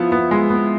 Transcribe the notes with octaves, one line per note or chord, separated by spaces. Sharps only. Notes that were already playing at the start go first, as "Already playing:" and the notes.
Already playing: F3 B3 E4
B3
G#3
B3